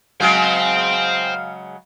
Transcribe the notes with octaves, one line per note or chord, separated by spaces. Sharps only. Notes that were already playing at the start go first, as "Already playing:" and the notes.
C#3 F#3 G#3 C5 F5 G5